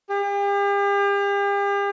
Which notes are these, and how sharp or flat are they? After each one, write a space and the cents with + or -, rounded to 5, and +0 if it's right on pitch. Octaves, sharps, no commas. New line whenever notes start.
G4 +40